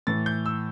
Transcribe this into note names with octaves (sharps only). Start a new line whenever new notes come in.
A2 E3 A6
G6
E6